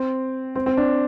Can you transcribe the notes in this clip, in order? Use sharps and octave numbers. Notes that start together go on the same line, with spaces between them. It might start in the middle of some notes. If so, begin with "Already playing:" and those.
Already playing: C4
C4
C4
D4